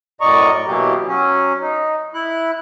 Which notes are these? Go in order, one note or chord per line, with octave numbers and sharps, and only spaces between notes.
F#2 A2 D5 D#5 A#5 C#6
B2 E3 F#3 A#3 G4
F#3 C#4
D#4
E4 F#6